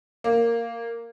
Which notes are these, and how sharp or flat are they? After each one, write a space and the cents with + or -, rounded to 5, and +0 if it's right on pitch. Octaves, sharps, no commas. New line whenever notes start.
A#3 -5